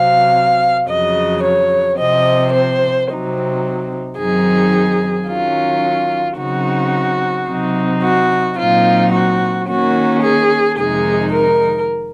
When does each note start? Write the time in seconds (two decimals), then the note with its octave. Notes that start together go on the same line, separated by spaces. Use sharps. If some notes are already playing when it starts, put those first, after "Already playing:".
Already playing: C3 F#3 C4 F5
0.88 F2 C#3 F#3 D#5
1.43 C#5
1.98 C3 F3 C4 D#5
2.54 C5
3.08 C3 F#3 C4 D#4
4.18 F#2 D#3 F#3 C4 D#4 G#4
5.28 D#3 F#3 C#4 F4
6.38 C#3 F#3 C4 D#4 F#4
7.48 C3 F#3 C4 D#4
8.03 F#4
8.58 A#2 F#3 C4 D#4 F4
9.13 F#4
9.68 D#3 A#3 C#4 F#4
10.23 G#4
10.78 F2 C3 D#3 G#3 D#4 G#4
11.33 A#4